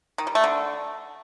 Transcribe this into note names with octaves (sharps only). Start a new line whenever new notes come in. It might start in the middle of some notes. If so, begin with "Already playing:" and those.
D#3
G3
A3
D3